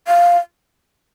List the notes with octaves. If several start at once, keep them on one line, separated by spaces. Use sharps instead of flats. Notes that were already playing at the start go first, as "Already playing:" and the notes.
F5